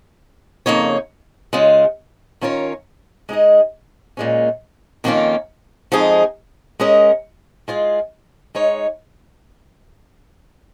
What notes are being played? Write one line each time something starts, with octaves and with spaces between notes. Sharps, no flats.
F2 C#3 A#3 D#4 C#5
C#3 G#3 F4
D#3 C#4 F4 A#4 C#5
G#3 D#4 G#4 D#5
A#2 G#3 C#4
F2 D#3 A#3 C#4 F4
F2 F3 G#3 D#4 G#4
G#3 C#4 A#4 D#5
G#3 F4 G#4
G#3 D#4 C#5